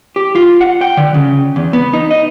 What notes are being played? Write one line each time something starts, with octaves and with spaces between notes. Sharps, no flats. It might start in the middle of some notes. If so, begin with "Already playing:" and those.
G4
F4
F#5
G5
D3
C#3
E2
B3
D#4
D#5